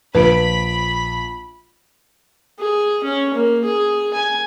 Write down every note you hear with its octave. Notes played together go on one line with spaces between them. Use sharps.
A#1 F3 B4 B5 D7
G#4
C#4
A#3
G#4
G#5